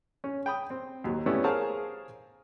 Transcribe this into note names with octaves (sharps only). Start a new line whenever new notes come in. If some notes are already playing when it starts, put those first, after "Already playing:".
C#4
G5 B5 D#6
C4
D#2 F#3
A3 B3 C#4 E4 G4 D5
G#4 A#4 C5 C#5 F5 A5